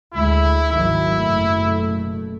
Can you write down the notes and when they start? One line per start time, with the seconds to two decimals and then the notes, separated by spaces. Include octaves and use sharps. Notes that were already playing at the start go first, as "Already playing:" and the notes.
0.14 D2 G#3 E4
0.72 G#1 D#3 F#3 E4
1.14 F#1 B2 A3